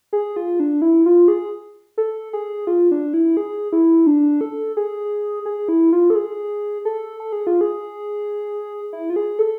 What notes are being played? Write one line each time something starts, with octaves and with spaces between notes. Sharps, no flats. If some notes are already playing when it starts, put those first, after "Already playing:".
G#4
F4
D4
E4
F4
G#4
A4
G#4
F4
D4
E4
G#4
E4
D4
A4
G#4
G#4
E4
F4
A4
G#4
A4
A4
G#4
F4
G#4
E4
F4
G#4
A4